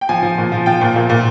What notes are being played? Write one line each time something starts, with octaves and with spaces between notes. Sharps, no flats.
G5
F3 G#5
F3
A#2
F3
F3 G5
A#2
A#2
A#2